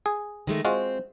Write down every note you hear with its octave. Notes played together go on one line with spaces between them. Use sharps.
G#4
D#3 G#3 A3
G#3 C4 F4 F#4